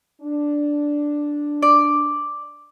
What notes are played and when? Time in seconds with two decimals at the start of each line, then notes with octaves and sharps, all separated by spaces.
0.21 D4
1.62 D5